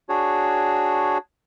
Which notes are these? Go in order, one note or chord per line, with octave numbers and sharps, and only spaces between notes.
D4 F#4 G#4 C#5